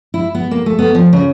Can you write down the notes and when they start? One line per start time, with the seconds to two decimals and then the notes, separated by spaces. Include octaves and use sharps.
0.14 E4
0.35 B3
0.51 A#3
0.66 A3
0.79 B3
0.95 F3
1.13 C#3